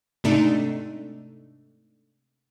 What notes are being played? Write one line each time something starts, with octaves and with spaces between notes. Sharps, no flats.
G#2 C3 A3 D4 D#4